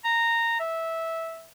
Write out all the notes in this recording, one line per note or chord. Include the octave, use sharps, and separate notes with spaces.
A#5
E5